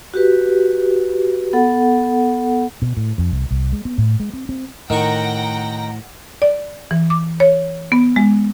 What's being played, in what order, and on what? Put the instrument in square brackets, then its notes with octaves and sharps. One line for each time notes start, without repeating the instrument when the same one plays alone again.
[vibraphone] F#4 G4 B4
B3 A4 F#5
[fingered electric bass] B2
A2
F2
C2
C2
G#3
B3
A2
G#3
C4
C4
[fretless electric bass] A2 [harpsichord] D#3 C#6 [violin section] F#5 G5 A#6 [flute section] A#5
[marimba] D5
E3
D6
C#5
B3
G#3